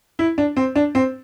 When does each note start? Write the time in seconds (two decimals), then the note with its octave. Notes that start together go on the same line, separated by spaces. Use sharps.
0.19 E4
0.38 D4
0.57 C4
0.76 D4
0.95 C4